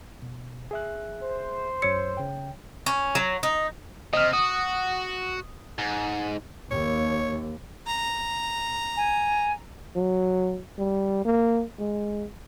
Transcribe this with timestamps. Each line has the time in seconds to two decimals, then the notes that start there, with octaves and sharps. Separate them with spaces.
0.22 B2
0.71 G#4 E5 F#6
1.23 C5
1.82 F#2 C#5 E6 C#7
2.17 C#3 G5
2.86 C#4
3.15 F#3
3.43 D#4
4.13 C3 D#5 F6
4.33 F#4 D#6
5.78 G#2
6.71 D#2 C#5
7.87 A#5
8.97 G#5
9.96 F#3
10.79 G3
11.25 A#3
11.79 G#3